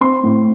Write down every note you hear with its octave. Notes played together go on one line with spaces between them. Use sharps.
C4 C6
A2